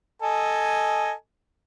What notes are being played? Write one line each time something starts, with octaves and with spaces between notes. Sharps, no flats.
A4 D#5 G#5